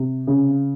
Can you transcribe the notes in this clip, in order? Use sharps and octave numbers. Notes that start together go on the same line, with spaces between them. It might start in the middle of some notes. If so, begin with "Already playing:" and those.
Already playing: C3
C#3